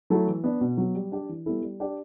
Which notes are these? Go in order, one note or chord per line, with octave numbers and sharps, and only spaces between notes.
F#3 A3 E4 A4
E3
B3 D4
B2
F#3 B3
G3
D4 G4 D5
E3
G3 B3 E4 A4
G3
D4 G4 D5